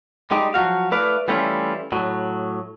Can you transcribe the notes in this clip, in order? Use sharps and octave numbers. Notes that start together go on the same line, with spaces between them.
G3 G#3 D#4 G4
F3 F#3 F#4 F5
A3 E4 B4 D5 F5
E3 G3 A3 C#4 E4 F4
A2 F#3